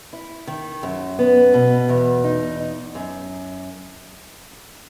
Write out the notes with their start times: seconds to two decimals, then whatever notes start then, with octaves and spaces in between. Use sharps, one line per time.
0.13 E4
0.47 D#3
0.83 F#2
1.19 B3
1.54 B2
1.89 E2
2.24 D#4
2.59 D#4
2.95 F#2